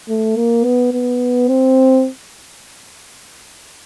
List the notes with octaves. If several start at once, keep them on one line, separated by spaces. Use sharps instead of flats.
A3
A#3
B3
B3
C4